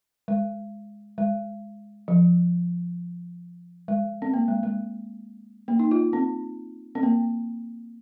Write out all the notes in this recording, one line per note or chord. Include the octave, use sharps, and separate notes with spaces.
G#3
G#3
F3
G#3
C4
A#3
G#3
G#3
A#3
D#4
F4
C4
C4
A#3